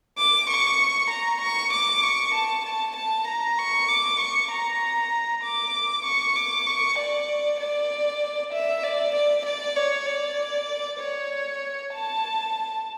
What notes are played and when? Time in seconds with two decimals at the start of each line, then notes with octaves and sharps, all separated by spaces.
0.18 D6
0.49 C#6
1.10 A#5
1.42 C#6
1.73 D6
2.03 C#6
2.35 A5
2.66 A5
2.96 A5
3.28 A#5
3.58 C#6
3.88 D6
4.20 C#6
4.51 A#5
5.44 D6
6.05 C#6
6.36 D6
6.67 C#6
6.99 D5
7.60 D5
8.53 E5
8.83 D5
9.15 D5
9.46 D5
9.76 C#5
10.07 D5
11.00 C#5
11.93 A5